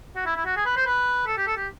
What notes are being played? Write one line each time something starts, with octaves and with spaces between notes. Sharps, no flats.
F#4
E4
E4
F#4
G#4
B4
C5
B4
A4
G4
A4
G4